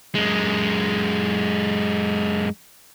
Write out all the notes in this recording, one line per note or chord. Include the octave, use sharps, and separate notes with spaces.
F#2 G#3